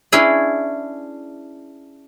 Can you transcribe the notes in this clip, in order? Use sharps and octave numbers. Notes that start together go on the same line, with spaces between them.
C#4 D4 E4 G#4 B4